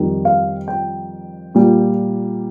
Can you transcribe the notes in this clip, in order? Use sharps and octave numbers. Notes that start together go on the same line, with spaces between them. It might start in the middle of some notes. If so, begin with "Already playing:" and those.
Already playing: F2 D#3 G3
F5
G5
A#2 G3